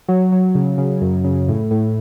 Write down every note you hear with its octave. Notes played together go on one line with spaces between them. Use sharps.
F#3
F#3
C#3
C#3
F#2
C#3
A2
A2